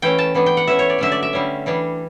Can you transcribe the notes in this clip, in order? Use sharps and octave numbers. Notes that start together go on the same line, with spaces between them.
E3 A3 C#4 G5
A5
E3 B3 D4
G5
F#5
E3 A3 C#4 E5
C#5
D5
D3 F#3 A3 C#4 E5
D5
E5
D3 G3 C#4
E3 G3 D4